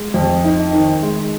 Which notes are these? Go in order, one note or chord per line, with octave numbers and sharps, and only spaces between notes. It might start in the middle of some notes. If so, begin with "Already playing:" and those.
Already playing: G#3
F2
D#4
D#3
G#3